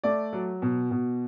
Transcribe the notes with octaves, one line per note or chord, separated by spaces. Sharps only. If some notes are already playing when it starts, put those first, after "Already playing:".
A3 D5
F#3
B2
B2